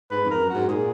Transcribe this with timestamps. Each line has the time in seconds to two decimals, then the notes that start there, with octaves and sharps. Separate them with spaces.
0.11 G#2 B4
0.25 F2
0.30 A#4
0.40 F#2
0.50 G#2 F#4
0.69 A#2 G#4